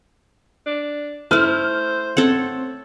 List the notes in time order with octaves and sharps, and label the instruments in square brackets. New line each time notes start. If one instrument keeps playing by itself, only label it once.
[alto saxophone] D4
[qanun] A3 E4 [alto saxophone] C5 [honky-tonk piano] F6
[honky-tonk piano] C4 [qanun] A4 C#5 F#5